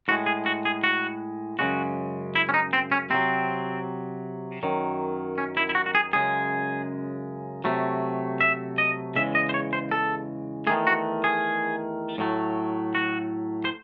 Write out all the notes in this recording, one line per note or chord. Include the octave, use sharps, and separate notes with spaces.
A2 G#3 F#4
G#4
F#4
G#4
F#4
F#2 C#3 G#3 F#4
E4
C#4
D#4
C4
C#4
C3 D#3 F#3 C4
F#2 D#3 F#3
C#4
E4
E4
F#4
F#4
G#4
F#2 C#3 G#3 G#4
C3 F#3 A3
E5
D#5
E2 C#3 G#3 E5
D#5
C5
C#5
C5
A4
E2 D#3 A3 G#4
F#4
G#4
A2 F#3 A3
F#4
C5